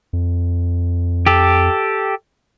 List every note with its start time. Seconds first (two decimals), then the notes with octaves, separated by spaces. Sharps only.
0.13 F2
1.26 G4 A4